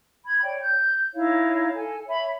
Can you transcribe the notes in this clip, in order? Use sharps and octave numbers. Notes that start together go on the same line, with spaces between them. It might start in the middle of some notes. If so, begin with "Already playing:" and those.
B5 G#6
C#5 D5 G5
G6
D#4 E4 C#5 F5
A4 G#5
C#5 E5 B5